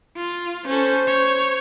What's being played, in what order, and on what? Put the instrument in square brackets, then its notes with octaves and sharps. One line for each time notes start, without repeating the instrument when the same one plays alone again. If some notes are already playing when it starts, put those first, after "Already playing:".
[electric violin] F4
[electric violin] C#4 A4 [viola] C5
[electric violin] C#5